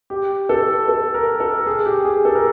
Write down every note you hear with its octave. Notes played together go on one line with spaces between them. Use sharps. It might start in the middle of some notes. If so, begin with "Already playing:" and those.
G4
A4
A4
A#4
A4
G#4
G4
G#4
A4
A#4